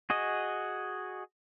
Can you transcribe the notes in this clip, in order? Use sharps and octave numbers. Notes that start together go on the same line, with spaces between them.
F#4 G#4 D#5